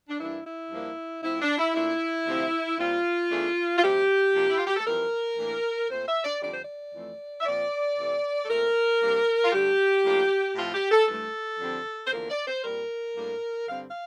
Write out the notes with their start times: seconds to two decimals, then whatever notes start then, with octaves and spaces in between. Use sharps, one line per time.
0.08 D4
0.19 G2 E3 A#3 D4 E4
0.45 E4
0.71 G2 F3 A#3 D4
1.23 A2 F3 C4 E4
1.40 D4
1.57 E4
1.74 A#2 A3 D4 E4
2.26 D2 C3 F3 C4
2.78 A#2 G3 C4 F4
3.30 E2 E3 A3 D4
3.77 F4
3.82 D2 C3 G3 G4
4.34 C3 F3 A#3 D4
4.48 E4
4.58 F4
4.67 G4
4.76 A4
4.86 F2 E3 G3 C4 A#4
5.37 A2 E3 A#3 D4
5.89 A#2 A3 C4 C5
6.07 E5
6.24 D5
6.41 F2 D3 G3 D5
6.52 C5
6.62 D5
6.93 F2 E3 A3
7.40 E5
7.45 A#2 F3 C4 D5
7.97 C3 E3 A3 C4
8.44 A4
8.49 A#2 A3 C4 A#4
9.01 C3 G3 A#3 D4
9.44 F4
9.52 G2 D3 A3 G4
10.04 A2 F3 A#3 D4
10.55 A2 F3 C4 F4
10.73 G4
10.90 A4
11.08 G2 E3 A3 A4
11.60 F2 D3 G3 C4
12.05 C5
12.11 E2 D3 F3 A#3 A#4
12.29 D5
12.46 C5
12.63 A#2 G3 C4 A#4
13.15 A2 G3 A#3 D4
13.67 G2 D3 G3 C4 F5
13.90 F5